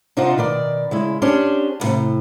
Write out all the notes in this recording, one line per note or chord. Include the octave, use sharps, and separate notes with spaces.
C3 D4 D#4 F4 C5 F#5
B2 D#3 D5
C#3 G#3 E4
C#4 D4 G4 G#4 C5
D2 A2 C3